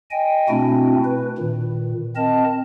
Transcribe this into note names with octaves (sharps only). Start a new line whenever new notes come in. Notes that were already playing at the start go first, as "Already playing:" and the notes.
D#5 G5 G#5
B2 A3 C4 D4 E4 F#4
B4
A#2 D#3
C4 A#4 D#5 A5